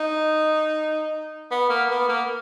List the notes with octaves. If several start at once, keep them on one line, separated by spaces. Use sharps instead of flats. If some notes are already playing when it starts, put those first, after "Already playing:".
Already playing: D#4
B3
A#3
B3
A#3